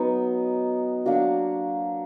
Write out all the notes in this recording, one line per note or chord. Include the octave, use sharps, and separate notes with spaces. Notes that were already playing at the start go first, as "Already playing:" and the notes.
Already playing: F#3 B3 D#4
F#3 A#3 D4 F#4